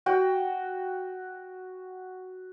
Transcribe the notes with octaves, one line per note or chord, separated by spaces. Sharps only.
F#4 G5